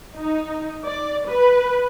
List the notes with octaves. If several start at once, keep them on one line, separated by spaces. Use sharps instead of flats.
D#4
D5
B4